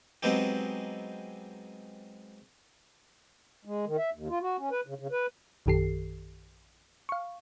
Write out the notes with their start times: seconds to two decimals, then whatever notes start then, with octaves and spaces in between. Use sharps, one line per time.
0.23 F#3 G#3 B3 C4 D#4 G4
3.65 G#3
3.86 D#3
3.98 E5
4.13 D#2
4.29 F4
4.41 F#4
4.58 C#4
4.71 B4
4.86 C#3
4.99 C#3
5.11 B4
5.66 A#1 F#2 D#3 G4 A4 C7
7.09 F5 C#6